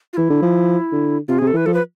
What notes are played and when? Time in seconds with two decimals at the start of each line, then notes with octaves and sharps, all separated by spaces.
0.13 F4
0.17 E3 E4
0.30 D3
0.42 F3
0.92 D3
1.28 C3 F4
1.38 C3 G#4
1.47 A4
1.53 E3 B4
1.66 F3 A4
1.74 B4